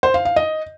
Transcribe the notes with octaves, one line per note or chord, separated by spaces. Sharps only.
C5
F5
F5
D#5